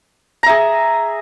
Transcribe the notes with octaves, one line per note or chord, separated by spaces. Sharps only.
G#4 E5 A#5